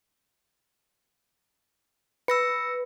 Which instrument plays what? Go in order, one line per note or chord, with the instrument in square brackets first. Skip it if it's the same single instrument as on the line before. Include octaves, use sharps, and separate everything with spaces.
[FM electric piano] B4 [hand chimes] E6 A#6 C#7